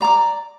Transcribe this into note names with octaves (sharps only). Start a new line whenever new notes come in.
D5 A#5 D6